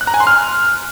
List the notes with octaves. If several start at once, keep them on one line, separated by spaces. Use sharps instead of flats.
F#6
A#5
G#5
C6
F6